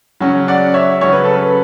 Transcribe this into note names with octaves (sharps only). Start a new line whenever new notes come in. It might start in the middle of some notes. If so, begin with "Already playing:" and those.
C#3 F#3 C#4
D5 F#5
C#5 E5
C#3 F#3 C#4 C#5
B4
A4
B4